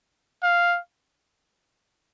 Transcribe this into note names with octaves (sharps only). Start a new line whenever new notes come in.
F5